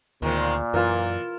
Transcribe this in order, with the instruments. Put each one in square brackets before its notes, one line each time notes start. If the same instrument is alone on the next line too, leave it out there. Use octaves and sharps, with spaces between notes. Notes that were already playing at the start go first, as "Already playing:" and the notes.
[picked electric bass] D2 [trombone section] A#2 [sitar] D#3 G#3 C4
[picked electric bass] F#2 [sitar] E3 [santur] F4 A#4